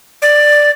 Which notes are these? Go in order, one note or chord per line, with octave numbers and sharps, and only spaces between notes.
D5